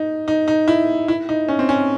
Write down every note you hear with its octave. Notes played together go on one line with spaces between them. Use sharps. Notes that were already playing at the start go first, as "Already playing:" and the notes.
Already playing: D#4
D#4
D#4
E4
E4
D#4
C#4
C4
C#4